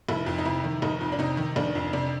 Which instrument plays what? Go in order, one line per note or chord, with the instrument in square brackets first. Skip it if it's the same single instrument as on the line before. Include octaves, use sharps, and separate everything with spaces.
[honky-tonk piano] F1 E4
F2
D#4
C3 E4
D#3
F1 D#4
F2
D4
C3 D#4
D#3
F1 D4
F2
C3 D4